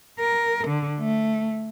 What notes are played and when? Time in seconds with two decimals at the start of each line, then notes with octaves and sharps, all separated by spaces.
0.20 A#4
0.67 D3
0.99 A3